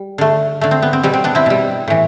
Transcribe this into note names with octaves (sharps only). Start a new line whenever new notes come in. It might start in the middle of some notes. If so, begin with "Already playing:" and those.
Already playing: G3
D3 A3
D3 A3
C4
B3
C4
B2 G3 C4
C4
B3 D4
C4 E4
B2 G3
A2 E3